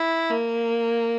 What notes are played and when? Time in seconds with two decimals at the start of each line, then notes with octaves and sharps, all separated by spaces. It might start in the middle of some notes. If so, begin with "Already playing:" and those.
Already playing: E4
0.30 A#3